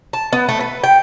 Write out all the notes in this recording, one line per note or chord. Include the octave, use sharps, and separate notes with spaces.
A5
B3
A3
B4
G5